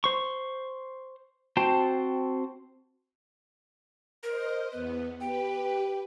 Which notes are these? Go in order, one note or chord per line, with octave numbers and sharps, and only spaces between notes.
C5 C#6
C4 F#4 C5 G5 A5
A#4 C5 D#5
E2 B3 B4
G4 B4 G5